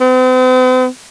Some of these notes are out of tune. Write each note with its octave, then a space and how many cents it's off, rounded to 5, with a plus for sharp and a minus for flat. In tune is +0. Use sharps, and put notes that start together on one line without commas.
C4 -45